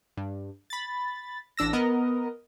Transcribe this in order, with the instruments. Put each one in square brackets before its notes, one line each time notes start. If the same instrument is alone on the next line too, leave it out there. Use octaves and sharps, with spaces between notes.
[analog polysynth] G2
B5 A6
A1 D4 E6 A#6
B3 A#4 D#5